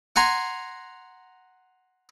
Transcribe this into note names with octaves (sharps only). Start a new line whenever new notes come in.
F#5 G#5 A#5 C6